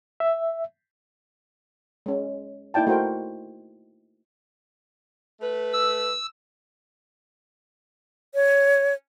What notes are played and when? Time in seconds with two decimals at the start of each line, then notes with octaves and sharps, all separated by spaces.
0.20 E5
2.06 G#3 C#4
2.74 A#3 D#4 E4 D5 G5 A5
2.87 A3 F#4 A#4 C5 G5
5.41 A3 B4
5.73 E6
8.35 C#5